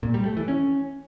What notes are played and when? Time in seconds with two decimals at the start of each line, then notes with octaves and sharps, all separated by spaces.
0.03 A#2
0.14 G3
0.25 A3
0.37 E3
0.48 C#4